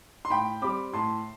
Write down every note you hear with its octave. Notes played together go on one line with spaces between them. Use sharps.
C6
A2 G5 B5
G3 C4 B5 D6
A2 A5 C6